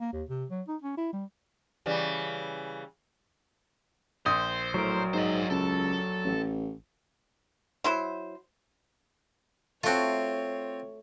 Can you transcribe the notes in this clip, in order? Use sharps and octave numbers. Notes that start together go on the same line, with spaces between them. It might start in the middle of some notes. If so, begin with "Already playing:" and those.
A#3
D#2
C3
F#3
D#4
C#4
E4
G3
C#3 E3 G3
A#1 C5 D#6
A2 F#3 A#4
G#2 C5 D#5
C#2 A4
A1
F#3 E4 C5
A3 C4 F4 F#4 A4 C#5